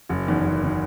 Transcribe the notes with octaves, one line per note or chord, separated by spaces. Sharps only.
F#1
E2 D#3
F#1
D#3